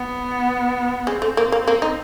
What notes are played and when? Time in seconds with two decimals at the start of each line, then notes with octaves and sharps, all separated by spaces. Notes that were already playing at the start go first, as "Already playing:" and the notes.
Already playing: B3
1.07 G#3 C4
1.22 A3
1.37 A#3
1.52 A#3
1.68 A#3
1.82 D#4